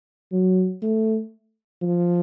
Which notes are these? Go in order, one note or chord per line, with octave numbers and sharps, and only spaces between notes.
F#3
A3
F3